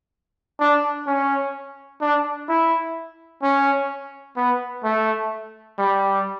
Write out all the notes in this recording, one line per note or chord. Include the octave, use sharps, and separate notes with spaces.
D4
C#4
D4
E4
C#4
B3
A3
G3